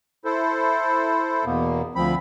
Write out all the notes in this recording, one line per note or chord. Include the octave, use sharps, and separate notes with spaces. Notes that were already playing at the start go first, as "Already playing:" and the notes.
E4 A4 C5
E2 B2 A#3 B3
D2 F3 C4 B5